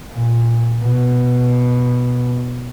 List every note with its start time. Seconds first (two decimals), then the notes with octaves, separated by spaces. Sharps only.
0.12 A#2
0.81 B2